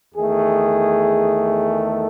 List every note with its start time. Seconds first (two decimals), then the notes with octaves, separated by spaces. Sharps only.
0.14 E2 D#3 A3 G#4
1.74 A4